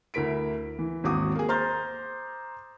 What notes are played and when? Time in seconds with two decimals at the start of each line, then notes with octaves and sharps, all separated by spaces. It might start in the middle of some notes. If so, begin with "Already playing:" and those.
0.14 D2 E4 A#4 B6 D7
0.79 E3
1.04 G#1 D#2 F#4 D6 D#6
1.35 A#3 G#4
1.48 C5 A#5 C6 F6 G6 A6